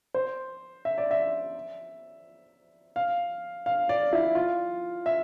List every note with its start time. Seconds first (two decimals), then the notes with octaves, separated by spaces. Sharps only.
0.14 C5
0.85 E5
0.98 D5
1.11 E5
2.96 F5
3.66 F5
3.89 D5
4.13 E4
4.35 F4
5.06 E5